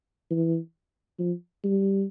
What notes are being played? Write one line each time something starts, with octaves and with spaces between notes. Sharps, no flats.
E3
F3
G3